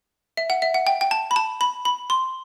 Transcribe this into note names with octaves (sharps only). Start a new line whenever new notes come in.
E5
F#5
E5
F#5
G5
G5
A5
B5
A5
B5
B5
C6